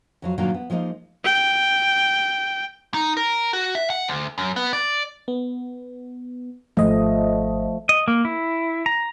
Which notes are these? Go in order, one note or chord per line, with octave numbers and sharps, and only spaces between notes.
F2 F#3 F4
G2 A#2 D#3 F#3 D4 F4
B3
F3 G#3 A#3 D4 D#4
G5
D#4
A#4
F#4
E5
F#5
D2
F#2
B3
D5
B3
G#1 F3 A3 D#5
D#5
A#3
E4
A#5